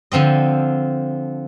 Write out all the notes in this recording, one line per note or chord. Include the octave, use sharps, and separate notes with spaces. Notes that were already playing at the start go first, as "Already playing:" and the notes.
D3 F3 C4 D#5